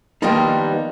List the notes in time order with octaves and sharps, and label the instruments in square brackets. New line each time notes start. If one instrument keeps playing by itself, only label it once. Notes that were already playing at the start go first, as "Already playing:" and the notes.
[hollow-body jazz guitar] D#3 F3 G3 A#3 B3 D#4